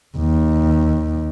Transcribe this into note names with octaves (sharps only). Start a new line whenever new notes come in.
D#2